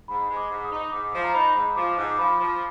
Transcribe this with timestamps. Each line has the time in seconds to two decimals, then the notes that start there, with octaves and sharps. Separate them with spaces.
0.08 G#2 B5
0.29 G#3
0.36 D6
0.51 G#2
0.65 D#6
0.72 D#4
0.92 G#2 D6
1.14 F3
1.24 A#5
1.34 D#4 B5
1.55 G#2
1.76 F3 D6
1.97 G#2
2.11 D6
2.18 F3 B5
2.40 F3